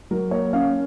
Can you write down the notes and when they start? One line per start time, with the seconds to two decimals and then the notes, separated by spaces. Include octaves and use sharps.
0.11 F#3 A#4
0.31 A#3 C#5
0.53 C#4 F5